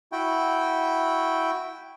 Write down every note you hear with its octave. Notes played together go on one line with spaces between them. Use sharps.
E4 F#4 G5